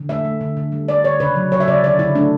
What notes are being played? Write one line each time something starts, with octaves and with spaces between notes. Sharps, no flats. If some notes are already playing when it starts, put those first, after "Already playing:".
Already playing: D3
A3 E5
A3
D3
D3
G3
G3 D5
D3 C#5
C#3 B4
F#3
F#3 C#5
E5
C#3 D5
D3 D5
D3 E4
A3 D4